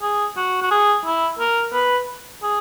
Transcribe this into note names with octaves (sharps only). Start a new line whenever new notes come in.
G#4
F#4
F#4
G#4
E4
A#4
B4
G#4